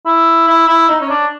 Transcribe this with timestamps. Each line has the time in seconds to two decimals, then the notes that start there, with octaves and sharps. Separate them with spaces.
0.06 E4
0.47 E4
0.67 E4
0.89 D#4
1.01 C#4
1.10 D4